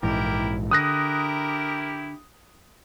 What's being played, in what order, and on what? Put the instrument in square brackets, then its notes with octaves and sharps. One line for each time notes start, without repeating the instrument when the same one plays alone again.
[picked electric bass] A#1 G#2 E3 [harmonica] E4 G4 A#4
[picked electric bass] D3 [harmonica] E4 G4 A#4 [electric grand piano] D#6 F#6 A#6